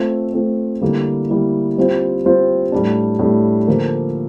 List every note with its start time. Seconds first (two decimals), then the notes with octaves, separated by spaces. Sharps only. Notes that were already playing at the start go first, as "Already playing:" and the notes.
Already playing: A3 C4 F4
0.34 A3 C4 F4
0.81 D3 G3 A#3 E4
1.30 D3 G3 A#3 E4
1.77 G3 C4 F4 C5
2.25 G3 C4 F4 C5
2.72 A2 G3 D4
3.19 A2 G3 D4
3.67 D3 F3 A#3 F4 A#4